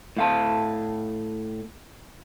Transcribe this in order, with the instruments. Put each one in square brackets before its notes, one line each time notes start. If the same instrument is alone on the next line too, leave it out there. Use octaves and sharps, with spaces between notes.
[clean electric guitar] A2 F5 A5